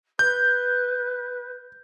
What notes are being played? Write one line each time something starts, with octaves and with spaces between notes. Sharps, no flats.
B4 G6